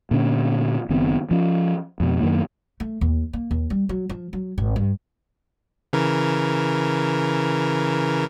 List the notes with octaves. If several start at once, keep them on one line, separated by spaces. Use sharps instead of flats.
A#2 D3 C#4
F#1 D#3 B3 C4
F3 C#4
F2 B2
F#2 D#3 A#3
A3
D#2
A#3
D#2
G3
F#3
F3
F#3
G#1
G2
C#3 E3 A#4